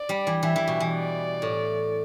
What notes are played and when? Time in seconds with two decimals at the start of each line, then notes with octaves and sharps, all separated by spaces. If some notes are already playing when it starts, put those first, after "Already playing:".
Already playing: D5
0.09 G3
0.27 E3
0.43 E3 E5
0.56 E3
0.68 B2
0.80 E3
0.93 D5
1.42 A2